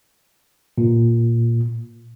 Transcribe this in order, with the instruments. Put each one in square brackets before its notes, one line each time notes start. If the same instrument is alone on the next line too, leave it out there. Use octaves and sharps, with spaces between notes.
[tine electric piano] A#2